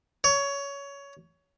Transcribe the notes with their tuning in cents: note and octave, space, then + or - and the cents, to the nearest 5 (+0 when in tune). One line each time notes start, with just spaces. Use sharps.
C#5 +20